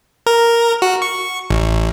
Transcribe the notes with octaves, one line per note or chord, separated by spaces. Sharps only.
A#4
F#4
C#6
A1